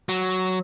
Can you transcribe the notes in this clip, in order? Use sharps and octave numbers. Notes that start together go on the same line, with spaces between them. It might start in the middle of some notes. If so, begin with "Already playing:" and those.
F#3